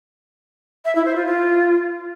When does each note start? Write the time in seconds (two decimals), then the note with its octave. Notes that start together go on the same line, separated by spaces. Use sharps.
0.85 E5
0.95 E4
1.05 C5
1.16 F4
1.26 F4